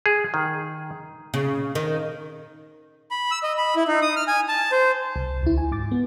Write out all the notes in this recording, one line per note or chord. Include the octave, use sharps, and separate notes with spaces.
G#4
D#3
C#3
D#3
B5
E6
D#5
B5
E4
D#4
D#6
F6
G#5
A5
C5
C2
D2 E4
G#5
G#2 D6 A6
B3